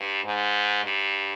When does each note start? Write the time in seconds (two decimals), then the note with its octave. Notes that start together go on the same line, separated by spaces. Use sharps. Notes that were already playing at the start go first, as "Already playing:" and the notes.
Already playing: G2
0.24 G#2
0.84 G2